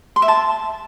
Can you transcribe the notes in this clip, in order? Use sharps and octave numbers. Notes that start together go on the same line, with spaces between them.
C6
E5
A5